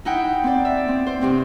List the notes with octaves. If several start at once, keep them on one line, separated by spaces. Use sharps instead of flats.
D#4 E4 F#5 G5
C4 D5
E5
C4
C5
G2 C3 C4